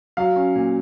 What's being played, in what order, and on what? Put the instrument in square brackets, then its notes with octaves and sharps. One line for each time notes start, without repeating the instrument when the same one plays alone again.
[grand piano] F#3 [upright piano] F5
[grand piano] C#4
A#2